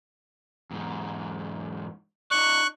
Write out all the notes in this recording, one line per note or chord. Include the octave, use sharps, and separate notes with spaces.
E2 G#2
D#4 D5 C#6 F#6